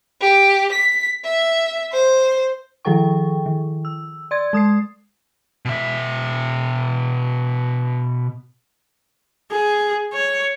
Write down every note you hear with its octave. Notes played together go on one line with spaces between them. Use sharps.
G4
B6
E5
C5
D#3 F3 G#4 A4 G5 C#6
D#3
E6
D5 C6 G#6 A6
G#3 D#6 G#6 C7
B2 E5
G#4
C#5